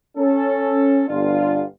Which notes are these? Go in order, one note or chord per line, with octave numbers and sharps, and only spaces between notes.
C#4 A4
G1 D4 F4